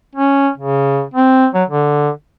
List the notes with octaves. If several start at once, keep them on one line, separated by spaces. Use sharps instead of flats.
C#4
C#3
C4
F#3
D3